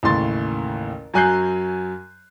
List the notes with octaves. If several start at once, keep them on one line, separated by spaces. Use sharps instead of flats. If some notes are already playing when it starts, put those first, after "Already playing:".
A1 D#2 A2 C#3 C6 A6
F#2 F#3 G#5 F#6 G6 C7